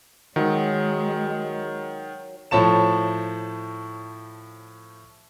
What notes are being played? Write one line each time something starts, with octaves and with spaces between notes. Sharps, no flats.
D#3 F#3 G#3 C#5
A2 F3 C#5 A5 E7